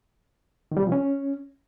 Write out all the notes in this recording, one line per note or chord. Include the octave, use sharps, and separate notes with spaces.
D#3
G3
C3
F3
C#4